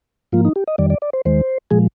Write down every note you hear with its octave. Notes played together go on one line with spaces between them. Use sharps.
G#2 F3 A#3 F4
D#4
G4
D#5
F2 D#3 G3 D5
D5
D5
C5
D#2 D#3 G#3 C5
A#2 F3 G#3 G#4